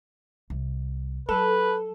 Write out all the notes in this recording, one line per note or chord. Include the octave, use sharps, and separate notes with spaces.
C2
F#3 A4 B4